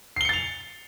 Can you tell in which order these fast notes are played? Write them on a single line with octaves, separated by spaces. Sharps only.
C7 G7 C#7 A6 F7